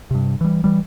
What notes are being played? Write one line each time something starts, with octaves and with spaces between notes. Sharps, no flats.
G2 C3
E3 G3
E3 G3